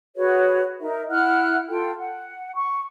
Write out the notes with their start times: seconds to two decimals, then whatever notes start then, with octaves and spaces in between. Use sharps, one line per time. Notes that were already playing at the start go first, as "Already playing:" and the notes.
0.16 F#4 G#4 B4 C#5
0.80 D#4 A#4 E5
1.11 E4 F#5 F6 F#6
1.68 F4 A4 G5
1.99 F#5
2.55 C#6